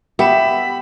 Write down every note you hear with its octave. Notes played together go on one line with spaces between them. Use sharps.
B3 G4 E5 B5 E7